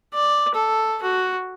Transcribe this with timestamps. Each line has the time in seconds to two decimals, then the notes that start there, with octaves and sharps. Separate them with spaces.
0.13 D5
0.54 A4
1.02 F#4